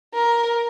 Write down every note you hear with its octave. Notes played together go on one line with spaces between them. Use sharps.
A#4